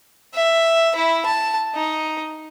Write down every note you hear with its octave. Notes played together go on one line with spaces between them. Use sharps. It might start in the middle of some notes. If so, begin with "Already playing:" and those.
E5
E4
A5
D#4